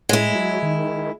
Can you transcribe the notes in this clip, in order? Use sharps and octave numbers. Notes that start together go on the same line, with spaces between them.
A2 G#3 E4
F#3
D#3